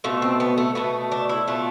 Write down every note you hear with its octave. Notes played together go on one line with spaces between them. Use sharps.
B2 A3 F4
C4
B3
A3
B2 A3 B3
D4
E4
B2 A3 F4